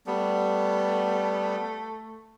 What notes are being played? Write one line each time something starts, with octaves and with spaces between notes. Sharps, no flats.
G3 A3 B3